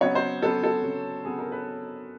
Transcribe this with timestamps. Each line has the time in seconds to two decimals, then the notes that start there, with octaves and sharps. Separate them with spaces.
0.01 C#3 F#3 B3 C#5
0.15 C5
0.42 C#3 F#3 B3 A4
0.64 A4
0.83 C#3 F#3 B3
1.25 C#3 F#3 B3 G#4
1.39 A#4
1.52 B4